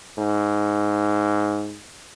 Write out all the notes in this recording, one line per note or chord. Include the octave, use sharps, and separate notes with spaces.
G#2